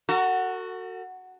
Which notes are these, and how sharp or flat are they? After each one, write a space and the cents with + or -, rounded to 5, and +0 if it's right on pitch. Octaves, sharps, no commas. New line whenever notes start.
F#4 +0 A4 +45